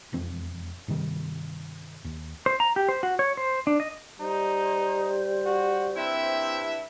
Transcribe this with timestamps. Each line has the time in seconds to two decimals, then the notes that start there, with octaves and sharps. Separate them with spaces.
0.13 E1 F2 C4
0.88 G2 C3 D#3 G3
2.05 D#2
2.46 C5
2.60 A#5
2.76 G4
2.89 C5
3.03 F#4
3.19 C#5
3.37 C5
3.67 D4
3.80 D#5
4.20 G3 D#4 C5
5.46 F#4
5.96 G2 C4 E4 E5